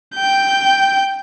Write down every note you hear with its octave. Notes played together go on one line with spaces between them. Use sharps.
G5 G6